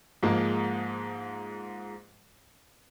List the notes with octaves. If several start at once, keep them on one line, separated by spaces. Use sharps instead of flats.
G#2 F3 G#3 A#3